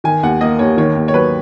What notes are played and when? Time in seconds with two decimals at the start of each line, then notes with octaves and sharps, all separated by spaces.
0.04 D#3 G#5
0.23 D#2 F#5
0.41 A#3 D#5
0.59 D#2 C#5
0.77 D#3 C#5
0.96 D#2
1.08 C#5
1.14 F#3 B4